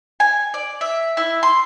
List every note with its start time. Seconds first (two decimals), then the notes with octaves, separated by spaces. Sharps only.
0.20 G#5
0.54 D5
0.81 E5
1.17 E4
1.43 C6